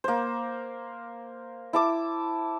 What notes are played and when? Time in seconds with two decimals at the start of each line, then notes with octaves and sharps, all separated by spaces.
0.04 A#3 C5
1.73 E4 A5 D6